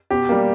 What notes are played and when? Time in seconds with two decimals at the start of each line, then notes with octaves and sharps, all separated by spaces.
0.10 B2 G4
0.29 G3 A#3